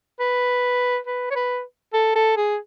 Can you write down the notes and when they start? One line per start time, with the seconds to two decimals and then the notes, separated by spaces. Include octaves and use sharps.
0.20 B4
1.07 B4
1.31 C#5
1.36 B4
1.94 A4
2.16 A4
2.37 G#4